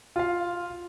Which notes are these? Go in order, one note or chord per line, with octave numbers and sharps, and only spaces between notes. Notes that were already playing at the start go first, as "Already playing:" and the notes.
F4 F5